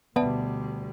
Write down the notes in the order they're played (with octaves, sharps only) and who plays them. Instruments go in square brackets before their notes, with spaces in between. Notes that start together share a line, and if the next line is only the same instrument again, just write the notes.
[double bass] D2 G3 [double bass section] B2 [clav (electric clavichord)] B3 [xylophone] D5 E5 A5